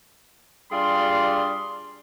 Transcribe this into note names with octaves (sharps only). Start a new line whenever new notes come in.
G3 D4 F4 G#4 C6